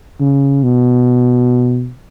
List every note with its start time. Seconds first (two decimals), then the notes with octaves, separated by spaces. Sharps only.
0.20 C#3
0.63 B2